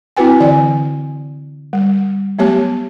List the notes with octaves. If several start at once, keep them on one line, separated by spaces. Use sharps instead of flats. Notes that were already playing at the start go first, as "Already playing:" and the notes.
C4 E4 F#4 B4 G5 G#5
D3 E3 D5 G#5
G3
F#3 A3 B3 G4 C#5 A5